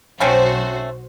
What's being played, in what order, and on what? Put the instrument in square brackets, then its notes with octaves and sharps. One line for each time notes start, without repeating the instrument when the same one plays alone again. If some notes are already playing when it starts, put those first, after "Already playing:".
[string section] B1 F#4 C5 [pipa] A3 C4 C#4